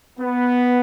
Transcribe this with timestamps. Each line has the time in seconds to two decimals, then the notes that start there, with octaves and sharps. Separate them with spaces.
0.19 B3